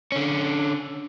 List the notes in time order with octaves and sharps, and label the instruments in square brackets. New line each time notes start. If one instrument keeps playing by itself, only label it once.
[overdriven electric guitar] D3 C#4